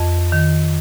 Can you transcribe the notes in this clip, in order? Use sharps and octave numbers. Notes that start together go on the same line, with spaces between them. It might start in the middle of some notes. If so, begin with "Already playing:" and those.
Already playing: F2 D#5
D#3